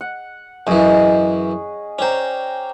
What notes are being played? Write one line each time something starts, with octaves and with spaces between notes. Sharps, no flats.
F#5
F#2 E3 C#4 G#4 D#5
C#4 C5 D5 G5 A#5